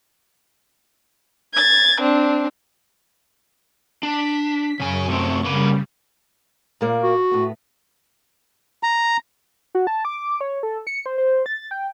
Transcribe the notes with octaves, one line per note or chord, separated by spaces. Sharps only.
G#6 A6
C4 D4
D4 B6
F#2 C#3 G#5 C#6
C3 A3 C4
C#3 G3 A#3 B4
A#2 A#3 D5
F#4
A2 B3
A#5
F#4
A5
D6
C#5
A4
C#7
C5
C5
A6
G5